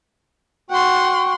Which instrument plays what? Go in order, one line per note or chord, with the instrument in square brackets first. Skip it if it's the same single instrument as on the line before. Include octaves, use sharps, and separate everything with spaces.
[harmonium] F#4 G5 [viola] F#5 C6